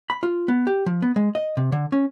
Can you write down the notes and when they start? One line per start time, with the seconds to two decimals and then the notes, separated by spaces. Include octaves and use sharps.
0.10 B5
0.23 F4
0.48 B3
0.67 G4
0.86 F3
1.02 B3
1.16 G#3
1.35 D#5
1.57 C3
1.72 D3
1.92 C#4